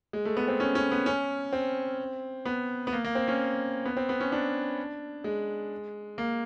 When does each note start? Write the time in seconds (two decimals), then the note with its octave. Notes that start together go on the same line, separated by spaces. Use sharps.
0.13 G#3
0.25 A3
0.37 B3
0.48 C4
0.60 C#4
0.75 C#4
0.92 B3
1.06 C#4
1.53 C4
2.46 B3
2.87 B3
2.93 A#3
3.04 A#3
3.15 C4
3.28 C#4
3.85 B3
3.97 C4
4.09 B3
4.20 C#4
4.32 D4
5.24 G#3
6.18 A#3